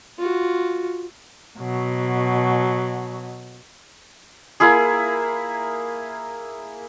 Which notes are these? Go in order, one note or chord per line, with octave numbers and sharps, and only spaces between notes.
F4 F#4
B2 F#3
A#3 E4 G#4